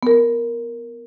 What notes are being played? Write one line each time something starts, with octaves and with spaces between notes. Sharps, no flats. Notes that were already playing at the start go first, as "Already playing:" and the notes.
B3 A#4